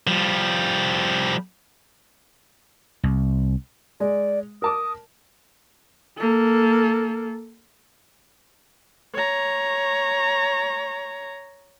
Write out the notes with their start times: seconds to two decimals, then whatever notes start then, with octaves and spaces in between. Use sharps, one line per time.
0.07 F3 G3
3.04 C2
4.00 G#3 D5
4.62 A#4 A5 D6 D#6
6.18 A#3 A4
9.14 C#5 A#5